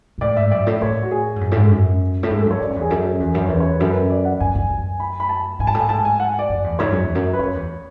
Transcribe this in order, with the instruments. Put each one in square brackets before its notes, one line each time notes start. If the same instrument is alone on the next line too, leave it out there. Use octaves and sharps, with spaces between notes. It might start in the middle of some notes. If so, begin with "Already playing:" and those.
[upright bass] B2
[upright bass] A2 [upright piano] D5
[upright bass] G#2 [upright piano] E5
[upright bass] F#2 [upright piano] D5
[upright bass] A2
[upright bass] A2 [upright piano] C#5
[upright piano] F#4
G#4
[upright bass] G#2
F#2
A2
G#2
F#2
[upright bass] A2 [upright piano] A4
[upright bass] G#2 [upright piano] G#4
[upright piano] A4
[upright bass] F#2
[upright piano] C#5
[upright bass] F#2 [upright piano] D5
[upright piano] C#5
[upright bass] E2
[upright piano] G#4
[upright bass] F#2 [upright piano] A4
[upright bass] E2
F#2
[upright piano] C#5
[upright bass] E2 [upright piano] B4
[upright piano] C#5
B4
[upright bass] F#2 [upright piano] A4
[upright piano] B4
D5
F#5
[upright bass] F#2 [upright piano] G#5
[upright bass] F#2
F#2
[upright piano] B5
B5
A5
[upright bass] G#2 [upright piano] G#5
[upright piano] A5
[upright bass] A2 [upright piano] G#5
[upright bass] G#2 [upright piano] A5
[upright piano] G#5
F#5
D5
[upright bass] F#2
E2
[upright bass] G#2 [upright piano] C#5
[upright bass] F#2
E2
F#2
[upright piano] B4
[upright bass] F#2 [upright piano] C#5
[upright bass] E2